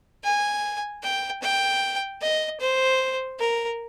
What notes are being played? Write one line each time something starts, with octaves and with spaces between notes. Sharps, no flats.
G#5
G5
G5
D#5
C5
A#4